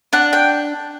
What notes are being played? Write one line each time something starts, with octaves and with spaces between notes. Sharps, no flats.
D4 F#5
G5